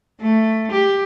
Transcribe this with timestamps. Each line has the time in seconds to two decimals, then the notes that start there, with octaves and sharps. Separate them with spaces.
0.21 A3
0.72 G4